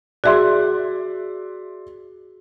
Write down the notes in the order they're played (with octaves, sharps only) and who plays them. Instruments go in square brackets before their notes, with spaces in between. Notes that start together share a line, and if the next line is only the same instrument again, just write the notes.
[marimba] F#4 G#4 [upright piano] D5 E5 C6